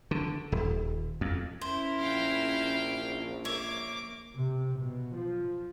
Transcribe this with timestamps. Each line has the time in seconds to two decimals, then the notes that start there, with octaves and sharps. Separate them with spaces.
0.11 D3
0.52 D#1
1.21 F2
1.61 C#4 E4 A#4 C5
1.99 A#1 F5 G5
3.45 A#3 C#5 E5 D6
4.34 C3
4.76 B2
5.14 F3